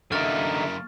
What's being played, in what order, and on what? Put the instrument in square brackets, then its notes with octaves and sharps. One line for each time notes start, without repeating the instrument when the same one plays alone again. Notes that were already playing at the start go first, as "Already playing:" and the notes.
[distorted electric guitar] F#2 A#3 [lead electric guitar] D3 D#4 [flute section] E5 [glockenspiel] C#6 F6 A6